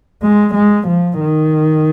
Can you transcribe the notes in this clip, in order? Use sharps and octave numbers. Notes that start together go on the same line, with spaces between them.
G#3
G#3
F3
D#3